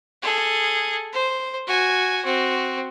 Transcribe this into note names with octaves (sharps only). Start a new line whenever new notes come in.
G#4 A4
C5
F#4 G#5
C4 F#4